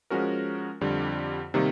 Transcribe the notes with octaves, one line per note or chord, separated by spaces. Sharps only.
F3 G#3 C#4 F#4 A#4
F2 D3 G3
C3 D#3 G3 A#3